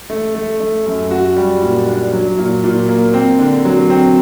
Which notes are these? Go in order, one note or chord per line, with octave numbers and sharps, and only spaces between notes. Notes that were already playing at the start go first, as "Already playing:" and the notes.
A3
A3
A3
F#2
F#4
G3
A#2
D4
F#3
A#2
A#2
A#3
C4
D3
F#3
C4